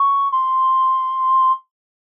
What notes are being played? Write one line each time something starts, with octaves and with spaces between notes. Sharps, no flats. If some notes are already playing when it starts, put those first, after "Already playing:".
Already playing: C#6
C6